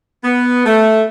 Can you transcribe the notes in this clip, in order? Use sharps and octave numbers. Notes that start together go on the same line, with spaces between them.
B3
A3